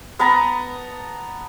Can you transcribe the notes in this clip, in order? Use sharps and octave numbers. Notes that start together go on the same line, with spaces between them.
B3 B4 A5 A#5